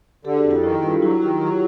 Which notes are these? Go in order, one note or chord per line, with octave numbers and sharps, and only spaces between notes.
D3 G4 A4
F#4 G#4
F2
E4 F#4
D#3 E4 F#4
F#4
G2 F4
F#3 E4 F#4
D#3 F4 G4
F#3 F4 G4